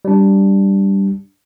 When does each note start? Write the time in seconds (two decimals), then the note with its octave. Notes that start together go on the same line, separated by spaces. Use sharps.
0.05 G3 D4